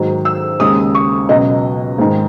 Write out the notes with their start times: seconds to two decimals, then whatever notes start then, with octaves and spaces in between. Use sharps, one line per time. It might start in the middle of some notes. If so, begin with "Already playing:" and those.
Already playing: G#2 D#3 F#3
0.25 E6
0.60 D#2 C#3 G#3 D#6
0.95 C#6
1.29 C#2 B2 F#3 D#5
1.98 G#2 D#3 G#3